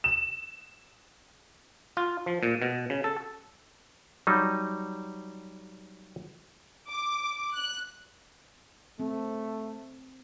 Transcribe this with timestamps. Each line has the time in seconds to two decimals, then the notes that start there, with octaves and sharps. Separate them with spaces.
0.04 E7
1.97 F4
2.26 F3
2.43 A#2
2.62 B2
2.90 C#3
3.04 A4
4.27 F#3 G3 D#4
6.89 D6
7.52 F#6
8.99 A3 C4